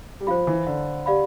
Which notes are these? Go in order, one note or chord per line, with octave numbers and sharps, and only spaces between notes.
G3
F3 C5 F5 B5
E3
D3
G4 D5 F5 B5